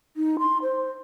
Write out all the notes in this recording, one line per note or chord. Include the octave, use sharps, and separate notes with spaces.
D#4
C6
C5